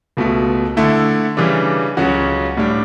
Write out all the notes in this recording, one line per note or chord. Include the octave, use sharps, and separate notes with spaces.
C#2 B2 A3
D3 A3 E4
C#3 E3 G3 D4
C#2 C#3 F#3 C#4 F#4
A2 G3 D4